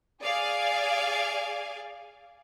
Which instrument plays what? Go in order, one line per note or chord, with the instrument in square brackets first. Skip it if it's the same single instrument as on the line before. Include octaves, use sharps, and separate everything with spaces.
[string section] G#4 D5 F5 G#5